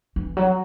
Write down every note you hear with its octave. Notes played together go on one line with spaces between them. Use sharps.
E3
F#3